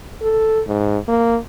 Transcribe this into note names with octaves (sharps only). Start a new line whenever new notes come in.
A4
G#2
A#3